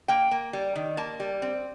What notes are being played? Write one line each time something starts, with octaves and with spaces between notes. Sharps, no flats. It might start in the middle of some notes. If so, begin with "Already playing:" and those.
A#3 G5
A#3
G3
D#3
A#3 A5
G3
C4